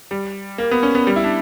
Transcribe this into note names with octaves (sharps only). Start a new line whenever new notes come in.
G3
A#3
B3
C#4
B3
G3
E4
D4